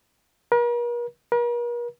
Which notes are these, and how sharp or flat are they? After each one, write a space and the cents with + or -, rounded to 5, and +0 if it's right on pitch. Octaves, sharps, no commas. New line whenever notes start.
A#4 +45
A#4 +45